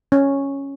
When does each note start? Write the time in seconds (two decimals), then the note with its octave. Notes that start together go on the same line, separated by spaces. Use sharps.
0.12 C#4